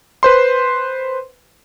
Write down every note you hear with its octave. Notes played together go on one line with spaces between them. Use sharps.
B4 C5 C6